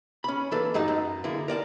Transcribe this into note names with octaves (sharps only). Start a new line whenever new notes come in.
C#4 B5
E3 A#3 A4 B4
G2 F#3 D#4 D#5 A5
F#2
D3 A#3 E4 G#4
A#4 D5 G5 A5